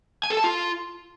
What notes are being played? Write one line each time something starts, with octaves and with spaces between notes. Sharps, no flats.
G#5
A4
A5
F4